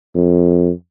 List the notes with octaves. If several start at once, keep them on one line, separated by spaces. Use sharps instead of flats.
F2